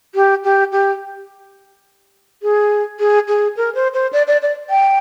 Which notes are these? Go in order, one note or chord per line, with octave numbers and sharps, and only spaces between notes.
G4
G4
G4
G#4
G#4
G#4
A#4
C5
C5
D5
D5
D5
G5